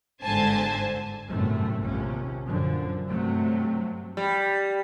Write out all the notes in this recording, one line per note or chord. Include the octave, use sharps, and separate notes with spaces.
G1 G#2 D3 C5 G#5 A5
G1 F#2 A2 C3 G3 A3
A#1 D#2 C3 C#4
F#2 A#2 D3 F3
G2 C3 F#3 A3
G3